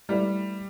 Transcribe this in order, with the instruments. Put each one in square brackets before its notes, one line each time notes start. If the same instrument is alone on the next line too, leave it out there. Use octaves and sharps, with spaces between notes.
[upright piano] G3 [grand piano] A3 E4 B4 D5